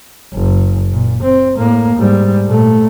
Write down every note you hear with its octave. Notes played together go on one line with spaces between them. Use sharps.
F#1
A#2
C4
A2 A#3
G#2 G3
A#2 A3